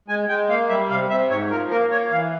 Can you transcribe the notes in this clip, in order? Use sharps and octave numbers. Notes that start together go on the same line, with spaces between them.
G#3 G#5
G#3 G5
A#3 F5
G3 E5
C3 F5
C3 E5
G#2 C#5
F3 A#4
A#3 A#4
A#3 C#5
E3 F5